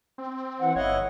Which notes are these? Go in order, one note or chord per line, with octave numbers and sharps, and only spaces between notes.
C4
E3 F#5
G1 E4 C#5 D#5 F5 F#5